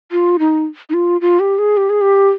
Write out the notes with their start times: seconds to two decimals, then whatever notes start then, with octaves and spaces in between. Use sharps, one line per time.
0.12 F4
0.39 D#4
0.90 D#4
0.94 F4
1.21 F4
1.40 G4
1.58 G#4
1.77 G4
1.90 G#4
2.01 G4